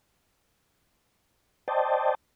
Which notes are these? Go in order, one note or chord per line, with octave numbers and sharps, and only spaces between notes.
C5 D5 D#5 G5 A5